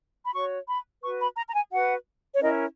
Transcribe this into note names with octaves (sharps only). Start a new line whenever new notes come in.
B5
F#4 C#5 C#6
B5
F#4 B4 C#6
B5
A#5
A#5
G#5
F#4 B4 F#5
C#5
C#4 E4 A#4 D#5